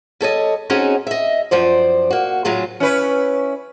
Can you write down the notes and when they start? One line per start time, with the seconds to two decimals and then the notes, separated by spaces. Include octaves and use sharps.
0.21 G3 A4 C#5 D#5
0.70 C4 C#4 D#4 F#4 G#4 D#5
1.07 D#5 E5
1.51 F#2 F3 C5 D5
2.11 A#3 F#4
2.45 A2 C#3 F#3 F4 G#4
2.80 C#4 E4 B4